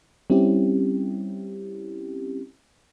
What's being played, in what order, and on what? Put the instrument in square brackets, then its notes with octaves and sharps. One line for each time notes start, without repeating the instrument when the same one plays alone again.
[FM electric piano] G3 C4 C#4 E4 G4